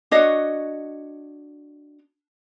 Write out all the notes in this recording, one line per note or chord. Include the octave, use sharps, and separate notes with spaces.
D4 F#4 C#5 D#5